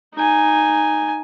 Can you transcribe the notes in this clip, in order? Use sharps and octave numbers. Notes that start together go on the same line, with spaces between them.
D#4 G#5